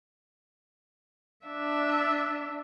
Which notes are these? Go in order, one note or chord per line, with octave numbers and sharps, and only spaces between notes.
D4 E5